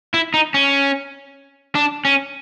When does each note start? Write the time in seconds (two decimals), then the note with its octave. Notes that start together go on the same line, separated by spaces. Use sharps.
0.14 E4
0.34 D#4
0.54 C#4
1.75 D4
2.05 C#4